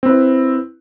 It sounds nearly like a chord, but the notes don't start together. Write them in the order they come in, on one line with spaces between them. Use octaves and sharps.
C4 B4 E4